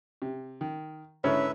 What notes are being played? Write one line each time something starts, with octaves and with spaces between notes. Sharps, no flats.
C3
D#3
G#2 D3 C#4 E4 B4 E5